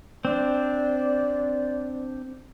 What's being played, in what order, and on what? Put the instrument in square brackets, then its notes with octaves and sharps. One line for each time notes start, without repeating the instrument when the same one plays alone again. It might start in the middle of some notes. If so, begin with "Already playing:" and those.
[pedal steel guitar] C4 D4 [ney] D5